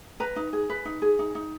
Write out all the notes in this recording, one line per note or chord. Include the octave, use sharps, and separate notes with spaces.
B4 A#5
D#4
G#4
B4
D#4
G#4
D#4
D#4